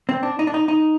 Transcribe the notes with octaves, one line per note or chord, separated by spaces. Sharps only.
C4
D4
D#4
D4
D#4
D#4